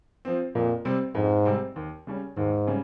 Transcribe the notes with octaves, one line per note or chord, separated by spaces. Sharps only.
F3 C4
F2 A#2
C3 G3 C4
F2 G#2
C3 G3 C4
D#2
C#3 G3 C#4
D#2 G#2
C#3 G3 C#4